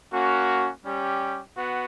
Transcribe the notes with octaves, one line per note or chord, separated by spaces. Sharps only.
A#3 C#4 F#4
G3 C#4 G4
B3 F#4